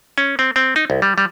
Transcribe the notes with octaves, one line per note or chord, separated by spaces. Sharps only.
C#4
C4
C4
D#4
C2
G3
G3